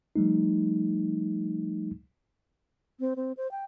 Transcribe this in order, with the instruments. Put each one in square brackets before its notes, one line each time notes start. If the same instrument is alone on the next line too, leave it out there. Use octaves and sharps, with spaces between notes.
[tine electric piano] F3 G3 A3 D#4
[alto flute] C4
C4
C5
G5